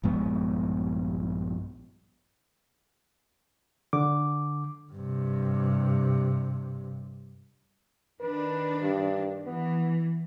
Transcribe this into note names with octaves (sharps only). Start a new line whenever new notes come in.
A#1 G2 G#3 B3
D3 D6
G2 C3
D#3 D4 B4
G2
E3 B3